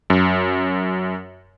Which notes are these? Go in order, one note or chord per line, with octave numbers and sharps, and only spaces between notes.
F#2